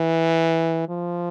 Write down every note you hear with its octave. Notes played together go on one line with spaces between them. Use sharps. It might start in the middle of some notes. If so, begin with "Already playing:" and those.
Already playing: E3
F3